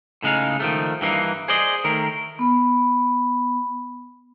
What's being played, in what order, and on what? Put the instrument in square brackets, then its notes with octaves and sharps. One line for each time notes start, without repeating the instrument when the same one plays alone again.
[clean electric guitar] A2 C#3 G#3 D#4 F5
D#3 F3 A3
G2 E3 A#3 D#4
G#4 C5 D5 D#5
D#3 A3 A#4
[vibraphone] B3 B5